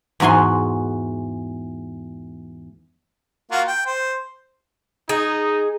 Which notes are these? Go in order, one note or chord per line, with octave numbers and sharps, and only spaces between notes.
E2 G#2 F#4 G#5 C6
A#3 F4 F#4
G5
C5
D#4 G#4